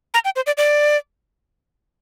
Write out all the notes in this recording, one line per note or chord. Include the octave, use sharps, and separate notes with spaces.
A#5
G5
C5
D5
D5